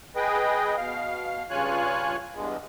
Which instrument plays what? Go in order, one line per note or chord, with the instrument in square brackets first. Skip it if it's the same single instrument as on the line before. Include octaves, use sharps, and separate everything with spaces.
[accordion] G#4 B4 D#5 G5
B2 F5
G2 C#3 F4 C#5 G#5 F#6
E2 G2 G#3